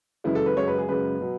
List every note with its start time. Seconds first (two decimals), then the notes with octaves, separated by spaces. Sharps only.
0.24 F#2 C#3 E3 G#3 E4
0.35 A4
0.46 B4
0.56 F#2 C#3 G#3 C#5
0.68 B4
0.78 G#4
0.88 F#2 C#3 G#3 B4
1.21 B2 F#3